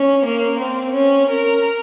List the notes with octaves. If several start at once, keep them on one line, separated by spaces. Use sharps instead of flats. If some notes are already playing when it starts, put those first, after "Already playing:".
Already playing: C#4
A#3
C4
C#4
A#4